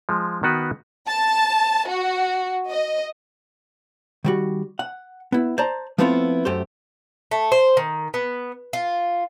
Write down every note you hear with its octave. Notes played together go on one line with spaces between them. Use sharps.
F3 G#3
D#3 B3 F#4 B4
A5
F#4
D#5
D#3 G3 F#4
F#5
B3 E4
C5 D5 A5 A#5
F3 A3 B3 C4 E4 F4
F#2 A3 G4 C5
A3
C5
D#3
B3
F4